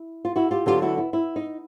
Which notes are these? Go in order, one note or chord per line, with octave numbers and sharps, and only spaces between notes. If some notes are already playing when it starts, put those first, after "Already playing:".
Already playing: E4
F4
E4 F#4
F4 G4
D3 F#3 B3 D4 F4 G4
E4 F#4
E4
E4
D#4